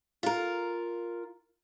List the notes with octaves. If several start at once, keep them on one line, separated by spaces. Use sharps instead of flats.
F4 A#4